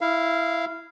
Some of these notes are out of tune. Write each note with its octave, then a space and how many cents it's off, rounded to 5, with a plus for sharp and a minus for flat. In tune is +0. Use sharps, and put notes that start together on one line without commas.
E4 +0 F5 -15